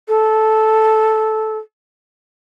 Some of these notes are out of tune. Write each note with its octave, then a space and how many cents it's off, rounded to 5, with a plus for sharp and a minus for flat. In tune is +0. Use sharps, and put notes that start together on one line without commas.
A4 -10